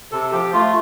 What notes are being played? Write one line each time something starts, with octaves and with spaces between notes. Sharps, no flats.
C3 A4
F3 G4
A3 F4